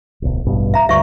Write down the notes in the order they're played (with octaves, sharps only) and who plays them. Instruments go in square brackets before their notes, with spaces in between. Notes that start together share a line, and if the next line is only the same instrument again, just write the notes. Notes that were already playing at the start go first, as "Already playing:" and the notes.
[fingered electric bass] D1 B1
A1 G2 B2
[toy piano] E5 A#5
[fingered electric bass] D2 G2 [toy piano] E5 C#6